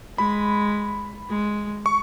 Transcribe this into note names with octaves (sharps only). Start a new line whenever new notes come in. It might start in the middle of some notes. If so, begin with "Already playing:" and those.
G#3 B5
G#3
C#6